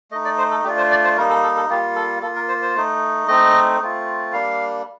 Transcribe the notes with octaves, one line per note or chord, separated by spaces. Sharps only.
A3 D#4 D#5
D5
C5
A4
A3 D4 F4 G4
C5
D5
C5
G3 A#3 D#4 A#4
A4
A4
A4
G3 A#3 F4 G4
A4
A#3 F4 A4
A#4
C5
C5
A3 D#4
A3 C4 D#4 D#5
A3 C4 F4
G3 A#3 D4 F5